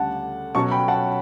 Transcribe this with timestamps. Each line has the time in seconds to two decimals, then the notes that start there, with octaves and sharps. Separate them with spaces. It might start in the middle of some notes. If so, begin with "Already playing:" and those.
Already playing: D2 C#3 G3 F#5 A5
0.55 B2 F#3 C#4 A5 C#6
0.71 G5 B5
0.88 F#5 A5